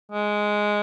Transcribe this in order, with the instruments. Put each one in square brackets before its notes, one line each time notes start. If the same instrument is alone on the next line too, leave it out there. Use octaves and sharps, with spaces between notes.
[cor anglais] G#3